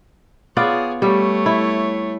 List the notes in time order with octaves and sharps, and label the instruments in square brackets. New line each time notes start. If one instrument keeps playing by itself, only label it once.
[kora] B3 F4 D5 [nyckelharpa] G#4 C#5
[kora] G3 [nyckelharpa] A3 C#5
[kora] E4